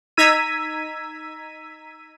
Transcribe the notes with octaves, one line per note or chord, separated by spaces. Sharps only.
D#4 A#5 E6 G#6 B6 D#7